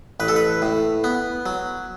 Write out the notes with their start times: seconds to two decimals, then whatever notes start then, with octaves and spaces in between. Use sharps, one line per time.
0.20 A1 B4
0.28 A4
0.36 B4
0.62 A2
1.04 B3
1.46 F#3